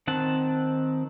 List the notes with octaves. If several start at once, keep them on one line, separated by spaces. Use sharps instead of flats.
D#3 C4 F#5 A5